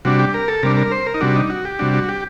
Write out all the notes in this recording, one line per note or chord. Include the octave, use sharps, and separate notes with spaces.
C3 G3 D4 F#4
G4
A#4
A4
C3 G3 D4 A#4
A#4
C5
A#4
D#4
C3 G3 D4 F#4
D#4
F#4
G4
C3 G3 D4 F#4
F#4
G4